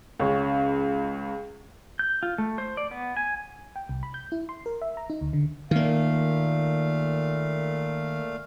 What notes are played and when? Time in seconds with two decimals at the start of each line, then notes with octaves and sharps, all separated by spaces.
0.20 C#2 C#3 C#5
1.99 G6
2.23 F4
2.38 A3
2.58 C5
2.77 D5
2.91 B3
3.17 G#5
3.76 G5
3.89 C2
4.03 B5
4.14 G6
4.32 E4
4.49 C6
4.66 A#4
4.82 E5
4.97 A#5
5.10 D#4
5.21 D2
5.33 D3
5.71 A#2 D#3 A3 A#3 F5